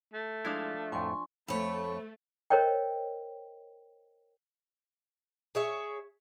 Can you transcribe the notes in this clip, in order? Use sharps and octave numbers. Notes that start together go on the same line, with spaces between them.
A3
F3 G#3 D4 E4 F5
F2 A2 G#5 C6 C#6
F2 A3 C#5 B5
A#4 C5 C#5 D#5 G5
G#4 C#5 E5